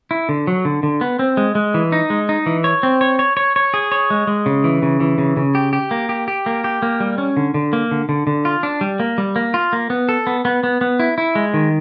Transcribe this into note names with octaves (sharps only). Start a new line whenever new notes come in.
E4
D3
F#3
D3
D3
B3
C4
G#3
G#3
E3
D#4
G#3
D#4
E3
C#5
C4
C#5
C#5
C#5
C#5
G#4
C#5
G#3
G#3
C#3
E3
C#3
E3
C#3
C#3
G4
G4
A#3
G4
G4
A#3
G4
A#3
G3
C#4
D3
D3
A#3
D3
D3
D3
F4
D4
G3
A#3
G3
A#3
F4
A#3
B3
A4
B3
B3
B3
B3
E4
E4
G#3
D#3